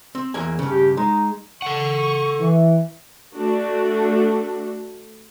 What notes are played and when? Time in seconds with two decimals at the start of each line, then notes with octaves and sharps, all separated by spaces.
0.15 C4
0.34 E2 A#3 G#5
0.59 G2 C#3
0.70 G4
0.97 G#3 D#4
1.62 A4 F#5 C#6
2.40 E3
3.36 A3 D4 F#4